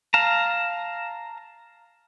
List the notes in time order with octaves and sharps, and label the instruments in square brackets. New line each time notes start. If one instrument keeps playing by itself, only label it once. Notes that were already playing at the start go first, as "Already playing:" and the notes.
[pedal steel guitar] F5 A5 A#5